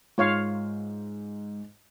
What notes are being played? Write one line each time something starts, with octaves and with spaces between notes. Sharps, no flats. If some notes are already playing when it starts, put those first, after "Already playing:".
G#2 F4 C#5 F5